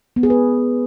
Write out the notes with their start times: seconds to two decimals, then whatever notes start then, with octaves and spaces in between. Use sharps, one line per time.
0.16 B3
0.23 G#4
0.30 B4